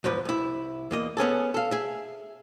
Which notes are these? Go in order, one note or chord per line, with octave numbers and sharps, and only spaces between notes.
E2 G#2 F3 B4
C2 E4
E2 A#3 D#5
B3 C#4 G#4 A4
A4 F5
G#4 E5